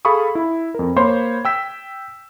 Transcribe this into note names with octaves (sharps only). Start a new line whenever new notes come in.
G#4 A4 F5 B5 C#6 D#6
E4
F2 A#4
A#3 C5 C#5 B5 C6 G#6
G5 E6 B6